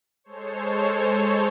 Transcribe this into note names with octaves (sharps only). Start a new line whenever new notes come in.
G#3 A4 C5 C#5